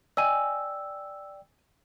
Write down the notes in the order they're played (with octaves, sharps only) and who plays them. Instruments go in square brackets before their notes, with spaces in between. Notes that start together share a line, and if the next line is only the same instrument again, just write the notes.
[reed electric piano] D5 G5 [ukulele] D#5 G#5 [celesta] E6